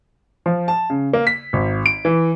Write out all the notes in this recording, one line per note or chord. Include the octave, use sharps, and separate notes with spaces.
F3
A5
C#3
A#3
B6
G#1
D7
E3